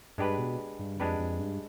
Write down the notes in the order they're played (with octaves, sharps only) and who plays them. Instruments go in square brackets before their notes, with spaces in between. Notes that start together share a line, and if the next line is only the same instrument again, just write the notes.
[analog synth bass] G2 [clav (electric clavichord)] G#3 D4 G4 B4
[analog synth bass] B2
G2
[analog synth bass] F2 [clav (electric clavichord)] G#3 D4 G4 B4
[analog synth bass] F2
G2